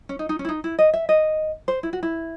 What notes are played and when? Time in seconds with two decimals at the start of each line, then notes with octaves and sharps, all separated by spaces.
0.09 C#4
0.19 D#4
0.29 D#4
0.39 C#4
0.45 E4
0.49 D#4
0.64 E4
0.79 D#5
0.93 E5
1.09 D#5
1.68 C5
1.83 E4
1.93 F#4
2.03 E4